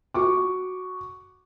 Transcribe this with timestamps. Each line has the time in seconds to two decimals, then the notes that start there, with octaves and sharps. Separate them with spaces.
0.14 F#4 C#6 D6